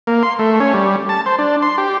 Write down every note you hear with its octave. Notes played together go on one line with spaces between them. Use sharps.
A#3
C6
A3
C#4
G3
A5
C5
D4
C6
G4